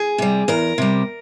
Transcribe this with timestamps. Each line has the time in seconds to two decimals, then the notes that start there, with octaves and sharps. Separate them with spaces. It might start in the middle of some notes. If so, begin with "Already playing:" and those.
Already playing: G#4
0.18 C3 G3
0.48 E2 A#4
0.78 C3 G3